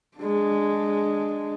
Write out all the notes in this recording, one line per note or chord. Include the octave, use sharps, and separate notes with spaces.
G#3 D4